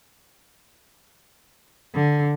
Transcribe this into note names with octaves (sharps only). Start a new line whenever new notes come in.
D3